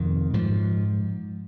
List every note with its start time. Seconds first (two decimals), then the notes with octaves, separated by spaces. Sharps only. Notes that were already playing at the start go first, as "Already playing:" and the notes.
Already playing: F2 C3 D#3
0.33 G#2 F3